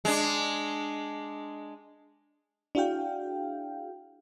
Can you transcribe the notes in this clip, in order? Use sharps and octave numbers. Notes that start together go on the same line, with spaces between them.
G#3 D4
D4 E4 F#4 G#4 F5 G5